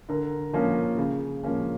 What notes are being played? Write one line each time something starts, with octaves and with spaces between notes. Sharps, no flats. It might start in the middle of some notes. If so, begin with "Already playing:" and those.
D3 A#4
F3 A#3 C#4
C#3
F3 A#3 C#4